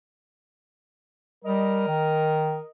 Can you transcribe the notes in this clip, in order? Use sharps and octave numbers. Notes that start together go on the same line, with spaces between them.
G3 A#4 D#5
D#3